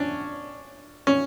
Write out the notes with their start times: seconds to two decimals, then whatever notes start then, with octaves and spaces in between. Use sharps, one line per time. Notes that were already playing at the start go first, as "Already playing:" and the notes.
Already playing: C#4 D4
1.07 C#4